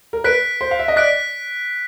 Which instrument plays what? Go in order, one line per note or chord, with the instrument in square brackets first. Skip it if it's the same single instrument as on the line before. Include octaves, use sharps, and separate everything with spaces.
[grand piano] A#4
[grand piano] B4 [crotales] F#6 B6 D7
[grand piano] C5
F5
E5
D#5
[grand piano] D5 [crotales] F#6 B6 D7